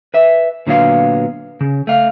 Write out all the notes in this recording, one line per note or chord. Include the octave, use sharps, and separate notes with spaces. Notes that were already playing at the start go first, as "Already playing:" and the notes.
B4 E5
A#2 D3 F#3 B3 D4 F5
C#3
A3 F5